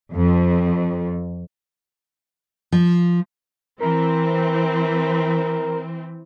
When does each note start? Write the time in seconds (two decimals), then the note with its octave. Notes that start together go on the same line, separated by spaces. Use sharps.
0.13 F2
2.72 F3
3.80 E3 C4 A#4